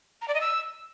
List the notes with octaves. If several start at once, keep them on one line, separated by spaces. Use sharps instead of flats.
A#5
D5
D#5
E6